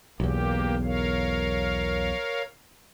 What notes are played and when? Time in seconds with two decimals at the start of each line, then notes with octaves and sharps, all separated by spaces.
0.20 B1 E2 A#3 G4
0.83 A#4 C#5 F5